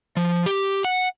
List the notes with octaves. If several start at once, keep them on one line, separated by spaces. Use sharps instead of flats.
F3
G4
F#5